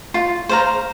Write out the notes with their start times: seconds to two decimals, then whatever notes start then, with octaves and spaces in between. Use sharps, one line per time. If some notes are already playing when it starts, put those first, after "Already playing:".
0.14 F4
0.49 C5 F5 A#5